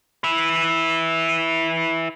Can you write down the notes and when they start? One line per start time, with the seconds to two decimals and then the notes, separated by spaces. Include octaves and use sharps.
0.24 E4 B4